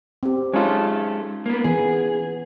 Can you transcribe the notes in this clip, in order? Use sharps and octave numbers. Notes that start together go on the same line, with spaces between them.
C4 G4
G#3 C#4 D#4 F4 A4
A#3 B3
E3 B3 G#4